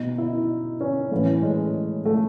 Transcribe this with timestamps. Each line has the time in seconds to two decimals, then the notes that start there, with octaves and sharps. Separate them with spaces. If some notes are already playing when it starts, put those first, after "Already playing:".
Already playing: B2 D#4
0.18 E4
0.81 C#4
1.12 A2 E3
1.43 G#3
2.05 A3